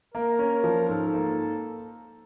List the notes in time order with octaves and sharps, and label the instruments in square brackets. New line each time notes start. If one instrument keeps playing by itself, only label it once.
[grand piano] A#3 [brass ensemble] A#4
[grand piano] C#4
F3
[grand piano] G#2 [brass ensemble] A4
[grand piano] A#3